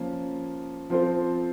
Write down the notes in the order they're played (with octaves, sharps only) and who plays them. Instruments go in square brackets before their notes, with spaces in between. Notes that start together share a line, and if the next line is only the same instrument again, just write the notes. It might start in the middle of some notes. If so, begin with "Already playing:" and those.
Already playing: [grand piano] F3 A#3 C#4
F3 C4 F4 A4 C5